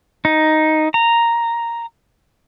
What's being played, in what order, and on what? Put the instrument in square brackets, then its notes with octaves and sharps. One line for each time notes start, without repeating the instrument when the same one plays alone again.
[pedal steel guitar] D#4
A#5